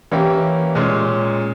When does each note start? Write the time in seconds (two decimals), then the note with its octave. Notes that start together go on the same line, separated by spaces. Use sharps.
0.12 E3 A#3 C#4 E4 G4
0.75 A#2 G#3 C#4